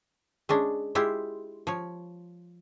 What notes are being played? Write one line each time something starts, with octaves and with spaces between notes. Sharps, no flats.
G#3 C#4 D4
G#3 E4 F4 G4
F3 C#5